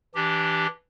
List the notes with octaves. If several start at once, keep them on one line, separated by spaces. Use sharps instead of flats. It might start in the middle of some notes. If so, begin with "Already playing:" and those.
E3 D4 G4